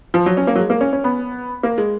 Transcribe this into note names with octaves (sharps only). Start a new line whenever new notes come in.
F3
F#3
C#4
A#3
F#3
G#3
A#3
C#4
C#4
B3
A#3
G#3